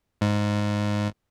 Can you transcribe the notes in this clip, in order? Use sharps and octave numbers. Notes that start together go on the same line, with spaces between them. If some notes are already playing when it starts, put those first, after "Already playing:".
G#2